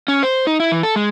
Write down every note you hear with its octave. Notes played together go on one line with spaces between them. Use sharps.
C#4
C5
D#4
E4
E3
A4
G#3